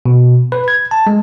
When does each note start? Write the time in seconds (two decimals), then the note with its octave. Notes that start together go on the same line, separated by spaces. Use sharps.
0.06 B2
0.52 B4
0.68 G#6
0.91 A5
1.07 G#3